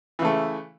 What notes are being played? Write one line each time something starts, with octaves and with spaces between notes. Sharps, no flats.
C#3 E3 A3